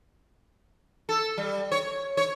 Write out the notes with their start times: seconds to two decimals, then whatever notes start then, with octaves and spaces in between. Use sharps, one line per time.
1.09 A4
1.38 G3
1.72 C#5
2.17 C#5